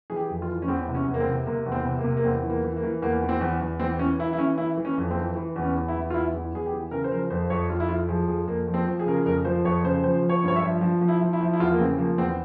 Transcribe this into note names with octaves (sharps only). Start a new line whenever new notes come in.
E3 G#4
G4
F2
F4
E3
C#4
E2 C4
C3
C#4
E2
A#3
C4
C3
C3 A#3
E2
C4
C3
A#3
C3
A#3
E2 C4
E3
A#3
E3
A#3
E3
E2 A#3
E3
C4
E2
E2
E3 C4
E3 C#4
E3 E4
E4
E3 C#4
E3 E4
E3
C#4
F2
C4
E3
E3
E2
C#4
E2
E4
E3
F4
E2 E4
E2
E2 G#4
G4
E3
C#3 A#4
C5
F3 A#4
F2 C5
F2 C#5
F2 F4
E4
F2 F4
F3 G#4
F2 G#4
F2 A#3
F3
C4
F3
G#4
C#3 A#4
G#4
F2 A#4
F3 C5
F2 C#5
C#3 C5
F3 C5
F3
C#5
G2 C#5
E5
F3
F3
F3
E4
F3
E4
F3
E4
E2 F4
A#3
C#3 C4
F3 A#3
E2 C4